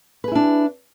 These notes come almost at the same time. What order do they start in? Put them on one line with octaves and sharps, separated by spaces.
B4 G#4 E4 D4